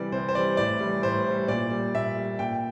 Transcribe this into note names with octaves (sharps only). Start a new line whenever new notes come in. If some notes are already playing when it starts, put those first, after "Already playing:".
Already playing: C3 E3 G3 D5
C3 C5
C5
E3 G3 D5
A2 D5
E3 G3
A2 C5
E3 G3
A#2 D5
G3
A#2 E5
G3
A#2 G5